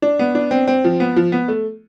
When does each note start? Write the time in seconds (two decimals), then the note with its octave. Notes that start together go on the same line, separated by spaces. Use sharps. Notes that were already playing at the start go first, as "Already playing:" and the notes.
0.02 D4
0.19 B3
0.35 D4
0.51 C4
0.67 C4
0.84 F3
1.00 B3
1.16 F3
1.32 B3
1.48 A3